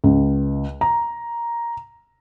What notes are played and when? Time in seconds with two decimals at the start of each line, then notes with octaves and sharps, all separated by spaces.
0.04 C#2
0.81 A#5